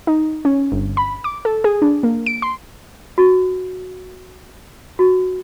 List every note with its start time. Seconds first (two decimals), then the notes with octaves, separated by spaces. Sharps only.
0.07 D#4
0.45 C#4
0.72 G1
0.97 B5
1.24 D6
1.45 A4
1.64 G#4
1.82 D4
2.03 A#3
2.26 D7
2.42 C6
3.18 F#4
4.99 F#4